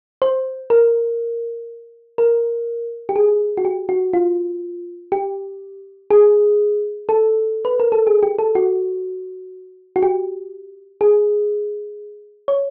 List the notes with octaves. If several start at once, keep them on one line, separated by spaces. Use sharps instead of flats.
C5
A#4
A#4
G4
G#4
F#4
G4
F#4
F4
G4
G#4
A4
B4
A#4
A4
G#4
G4
A4
F#4
F#4
G4
G#4
C#5